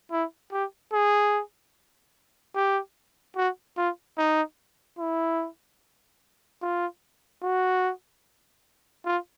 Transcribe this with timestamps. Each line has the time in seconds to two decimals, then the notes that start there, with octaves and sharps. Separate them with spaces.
0.11 E4
0.52 G4
0.93 G#4
2.55 G4
3.36 F#4
3.77 F4
4.17 D#4
4.99 E4
6.62 F4
7.43 F#4
9.05 F4